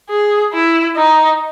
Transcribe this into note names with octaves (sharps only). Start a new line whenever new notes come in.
G#4
E4
D#4